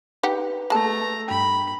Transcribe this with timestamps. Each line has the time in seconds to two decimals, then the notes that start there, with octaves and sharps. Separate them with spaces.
0.23 D#4 G4 B4 F#5
0.70 G#3 A3 A5 A#5
1.28 G2 G5 B5